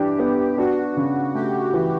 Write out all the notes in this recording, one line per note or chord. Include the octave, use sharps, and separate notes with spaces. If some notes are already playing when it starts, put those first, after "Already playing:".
Already playing: E3 D4 G4
B3
D4 F#4
C#3
A3 G4
E3